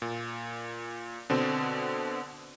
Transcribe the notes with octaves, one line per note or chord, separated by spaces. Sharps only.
A#2
B2 D3 C4